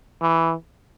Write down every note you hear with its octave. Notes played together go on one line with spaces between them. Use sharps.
E3